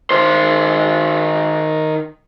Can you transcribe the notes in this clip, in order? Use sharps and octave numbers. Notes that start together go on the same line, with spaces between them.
D#3 C5